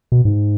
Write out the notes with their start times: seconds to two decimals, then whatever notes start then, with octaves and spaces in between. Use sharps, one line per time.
0.12 B2
0.25 G#2